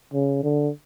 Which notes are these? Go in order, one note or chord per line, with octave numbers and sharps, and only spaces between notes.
C#3
D3